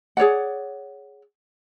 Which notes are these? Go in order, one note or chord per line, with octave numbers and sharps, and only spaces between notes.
G#4 C#5 D5 F#5